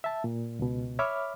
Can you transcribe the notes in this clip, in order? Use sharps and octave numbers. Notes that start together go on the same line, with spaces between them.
E5 A5
A#2
C#2 B2
C#5 E5 B5 D6 F6